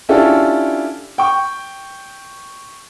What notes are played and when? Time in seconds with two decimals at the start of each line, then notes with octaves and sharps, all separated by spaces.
0.09 C#4 D4 E4 F4 G4 A4
1.18 G5 C#6